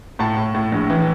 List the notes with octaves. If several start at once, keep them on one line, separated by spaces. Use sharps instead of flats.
A2 A5
A2
A2
A#1
E3